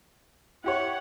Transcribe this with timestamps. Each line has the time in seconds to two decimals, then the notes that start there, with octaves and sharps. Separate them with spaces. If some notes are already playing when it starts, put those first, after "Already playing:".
0.64 E4 G4 C#5 F#5